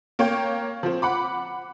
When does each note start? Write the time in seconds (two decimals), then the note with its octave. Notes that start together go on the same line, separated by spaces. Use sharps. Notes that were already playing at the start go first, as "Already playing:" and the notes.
0.19 A#3 C#5 G5
0.83 F3 C4
1.02 F#5 B5 D6